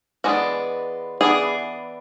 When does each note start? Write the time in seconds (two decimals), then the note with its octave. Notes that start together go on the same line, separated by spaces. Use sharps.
0.24 E3 G#3 B3 D4 F#4
1.21 E3 B3 D4 G#4